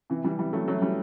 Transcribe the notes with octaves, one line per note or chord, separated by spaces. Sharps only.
C3 E3
E3 G3
E3 G3
F#3 A3
F#3 A3
E3 G3